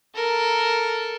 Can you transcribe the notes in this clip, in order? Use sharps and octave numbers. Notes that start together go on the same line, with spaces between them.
A4 A#4